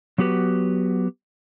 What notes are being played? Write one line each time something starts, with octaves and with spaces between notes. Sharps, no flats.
F#3 B3 F#4 G4 B4